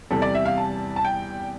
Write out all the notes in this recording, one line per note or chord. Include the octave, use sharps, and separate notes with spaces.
E2 C3 G3 A4
D5
E5
F5
A5
A5
G5